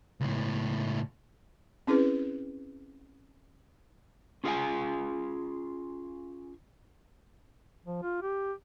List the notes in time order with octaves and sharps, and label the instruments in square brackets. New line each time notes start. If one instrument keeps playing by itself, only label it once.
[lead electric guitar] C#2 A2
[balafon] C4 C#4 E4 G#4 B4
[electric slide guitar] C#4 F4 G#4 D#5 F5 G#5
[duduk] F3
F4
G4